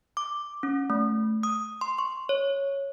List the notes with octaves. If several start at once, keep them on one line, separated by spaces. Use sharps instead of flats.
D6
C#4
A3
D#6
C6
C#6
C#5